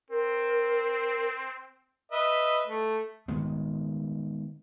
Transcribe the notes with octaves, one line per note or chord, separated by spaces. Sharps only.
C4 A#4
B4 D#5 E5
A3
D#3 G#3 B3